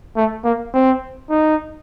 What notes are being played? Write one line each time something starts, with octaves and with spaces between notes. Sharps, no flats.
A3
A#3
C4
D#4